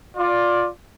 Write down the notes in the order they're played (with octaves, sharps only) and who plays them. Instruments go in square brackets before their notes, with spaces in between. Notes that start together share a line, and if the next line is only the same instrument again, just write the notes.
[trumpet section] F4 D5